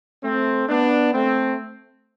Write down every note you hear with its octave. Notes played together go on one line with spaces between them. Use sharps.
A3 C4
B3 D4
A3 C4